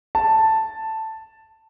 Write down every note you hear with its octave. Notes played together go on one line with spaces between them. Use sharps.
A5